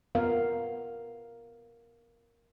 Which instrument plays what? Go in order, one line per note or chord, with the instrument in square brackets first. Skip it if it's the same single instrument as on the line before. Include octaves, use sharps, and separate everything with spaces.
[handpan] B3 A#4 F5